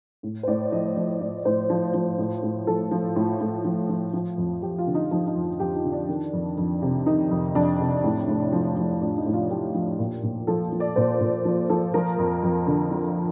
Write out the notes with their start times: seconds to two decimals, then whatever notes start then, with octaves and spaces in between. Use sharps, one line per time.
0.23 A2
0.43 C5
0.47 A2 D5
0.72 F3 D#5
0.97 F3
1.21 A2 D5
1.45 A2 C5
1.70 F3
1.94 F3
2.18 A2
2.43 A2
2.67 F3 A4
2.91 F3
3.16 A2
3.41 A2
3.65 F3
3.89 F3
4.13 F3
4.38 F2
4.63 F2 G4
4.79 F4
4.87 D3
4.95 D#4
5.11 F3 D#4
5.27 D#4
5.35 F2
5.60 F2 G4
5.76 D#4
5.84 D3
5.92 D4
6.09 D#3
6.33 F2
6.58 F2
6.82 C3
7.06 D#3 D#4
7.31 F2
7.55 F2 D4
7.80 C3
8.04 A2
8.28 A2
8.52 F3
8.77 F3
9.01 A2 D4
9.18 D#4
9.26 A2
9.34 F4
9.50 F3 G4
9.75 F3
9.99 A#2
10.23 A#2
10.47 F3 A4
10.72 F3
10.80 D5
10.96 A#2 C5
11.21 A#2
11.45 F3 F4
11.69 F3 A4
11.94 F3 A#4
12.18 F2
12.43 F2
12.67 D3
12.91 F3